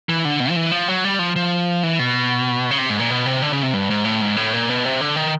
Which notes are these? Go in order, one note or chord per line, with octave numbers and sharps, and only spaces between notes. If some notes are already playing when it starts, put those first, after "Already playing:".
E3
D3
B2
F3
E3
F3
F#3
G3
F3
F3
E3
B2
C#3
C3
G#2
A#2
B2
C3
D3
C#3
C3
G2
G#2
A2
G#2
A2
A#2
B2
C3
D3
D#3